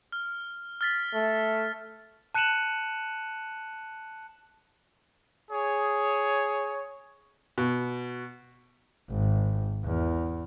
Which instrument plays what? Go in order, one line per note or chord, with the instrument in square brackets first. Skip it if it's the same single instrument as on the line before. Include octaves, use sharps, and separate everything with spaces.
[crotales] F6
F6 A6 B6
[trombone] A3
[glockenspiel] A5 F#6 C#7 D#7 E7 F#7
[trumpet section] G#4 C#5
[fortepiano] B2
[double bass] G#1
E2